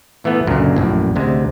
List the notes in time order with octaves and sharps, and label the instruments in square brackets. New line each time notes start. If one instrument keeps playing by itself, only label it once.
[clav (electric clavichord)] A#2 E3 A3 B3
C#2 F#2 A#2 D3
A#1 F#2 A2
D2 C3 G#3